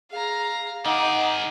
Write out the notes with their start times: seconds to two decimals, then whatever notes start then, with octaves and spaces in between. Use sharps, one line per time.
0.11 G#4 F5 A#5
0.85 D#3 D#4 G#4 F#5 D6